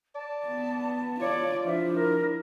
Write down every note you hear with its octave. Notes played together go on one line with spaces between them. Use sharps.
D5 A5
B3
F4 C#5 D5
F3 D4 E4 E5
A#4